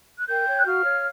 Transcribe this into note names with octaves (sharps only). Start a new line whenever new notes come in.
F#6
A#4 G5 G6
C#5
F#6
F#4 F5 F6
C#5